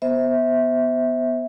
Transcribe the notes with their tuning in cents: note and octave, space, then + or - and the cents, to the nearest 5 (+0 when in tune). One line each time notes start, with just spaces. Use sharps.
B3 +0 C5 +0 E5 -15